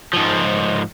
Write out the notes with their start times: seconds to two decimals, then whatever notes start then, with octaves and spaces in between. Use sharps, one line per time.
0.13 G#2 F3